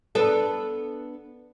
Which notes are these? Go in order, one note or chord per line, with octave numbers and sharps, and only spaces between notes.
B3 D4 A4